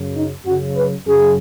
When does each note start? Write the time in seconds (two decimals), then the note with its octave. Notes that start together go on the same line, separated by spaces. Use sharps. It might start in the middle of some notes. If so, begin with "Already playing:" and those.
Already playing: F#2 C#3
0.14 D#4
0.45 F#2 C#3 F#4
0.75 B4
1.06 F#2 C#3 G#4